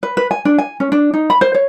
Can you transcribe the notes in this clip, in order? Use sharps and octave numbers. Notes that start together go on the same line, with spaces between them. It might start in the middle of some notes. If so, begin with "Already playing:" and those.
B4
B4
G#5
D4
G#5
C#4
D4
D#4
B5
C5
C#5